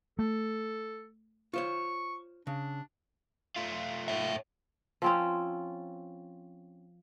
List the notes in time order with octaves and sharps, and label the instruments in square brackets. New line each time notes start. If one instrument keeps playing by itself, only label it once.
[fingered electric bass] A3 [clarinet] A4
[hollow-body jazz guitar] F4 C5 C#5 [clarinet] C#6
[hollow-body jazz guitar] C#3 [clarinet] D4
[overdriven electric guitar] A3 F4
[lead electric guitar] C#5 E5
[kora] F3 C4 C#4